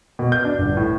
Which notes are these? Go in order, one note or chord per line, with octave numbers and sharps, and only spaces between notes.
B2
G6
D4
G1
A2